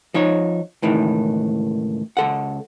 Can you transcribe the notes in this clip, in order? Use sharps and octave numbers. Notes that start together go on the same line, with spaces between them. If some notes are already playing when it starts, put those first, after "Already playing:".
F3 D#4 C#5
C#2 A2 D#3 E3
C#2 A4 F#5